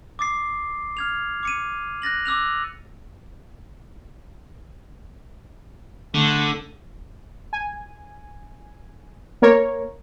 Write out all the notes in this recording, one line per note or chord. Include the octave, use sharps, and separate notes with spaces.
D6 D#6 A6 C7
F6 G#6 F7
D6 C#7 D#7
F#6 A6 A#6 F#7
D6 E6 F#6 F7
D3 A3
G#5
A#3 A#4 C#5